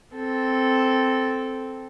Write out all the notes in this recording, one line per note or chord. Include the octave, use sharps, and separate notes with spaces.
C4 A4